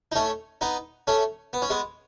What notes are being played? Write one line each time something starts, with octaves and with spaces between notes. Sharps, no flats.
D#4
A3 C#4
B3 D#4
A3 C#4
B3
C#4
G#3 B3